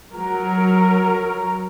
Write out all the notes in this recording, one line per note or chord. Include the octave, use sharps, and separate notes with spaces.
F#3 A#4